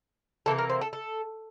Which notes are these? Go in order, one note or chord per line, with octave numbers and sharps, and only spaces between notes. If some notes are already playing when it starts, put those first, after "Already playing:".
C3 E3 A#3 A4
A#4
C5
A4
A4